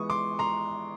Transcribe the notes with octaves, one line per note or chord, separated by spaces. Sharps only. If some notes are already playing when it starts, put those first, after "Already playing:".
Already playing: E3 G#3 B3 C#6 D#6
C6 D6
A#5 C6